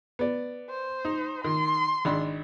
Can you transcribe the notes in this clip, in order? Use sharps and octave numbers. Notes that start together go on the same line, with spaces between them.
B3 D5
C5
D#4
D#3 C6
G#1 D4 B5